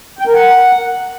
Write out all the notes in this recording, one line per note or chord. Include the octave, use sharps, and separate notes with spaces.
G5
A#4
F#5